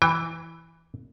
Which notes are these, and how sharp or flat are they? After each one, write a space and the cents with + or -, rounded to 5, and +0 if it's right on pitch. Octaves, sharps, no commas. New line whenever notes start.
E3 +0 G5 +40